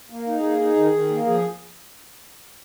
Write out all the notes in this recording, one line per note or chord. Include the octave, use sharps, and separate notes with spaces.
A#3
D#4
G#4
A#3
D#4
D#3
D#3
A#3
F3 G#4